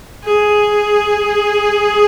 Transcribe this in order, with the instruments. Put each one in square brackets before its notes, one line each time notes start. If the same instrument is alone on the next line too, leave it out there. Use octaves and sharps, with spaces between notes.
[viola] G#4